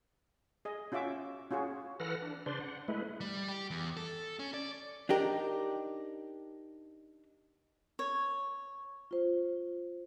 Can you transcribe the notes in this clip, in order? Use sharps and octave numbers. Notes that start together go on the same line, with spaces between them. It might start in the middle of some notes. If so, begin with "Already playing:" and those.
G#4 D#5
C#4 F4 F#4 E5 D6
C#4 F4 F#4 G#4
E3 A4 B4 F#5 F6 A#6
D4
C#3 D4 B4 C5 D5 C6
F#5
G#3 A3 E4 B4
G3
G4
E2
A4
C#4
D5
D4 D#4 G4 A#4
C#5
F4 C5